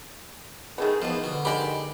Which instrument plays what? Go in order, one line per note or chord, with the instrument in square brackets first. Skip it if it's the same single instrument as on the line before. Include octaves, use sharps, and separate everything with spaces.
[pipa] D#3 A3 B3 [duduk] G#4
[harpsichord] E2 F3 [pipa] D#3 [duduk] B3
[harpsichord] B2 [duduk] D3
[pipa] D#3 G#3 B5 [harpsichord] G4 D5